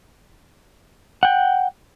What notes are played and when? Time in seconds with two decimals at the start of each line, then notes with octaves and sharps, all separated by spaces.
1.23 F#5 G5